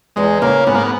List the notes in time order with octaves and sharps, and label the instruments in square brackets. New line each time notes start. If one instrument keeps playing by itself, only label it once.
[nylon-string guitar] E2 [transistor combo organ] G#3
[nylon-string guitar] C#3 [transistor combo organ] A#3
[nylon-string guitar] G#2 [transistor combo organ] B3
[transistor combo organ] A#3
B3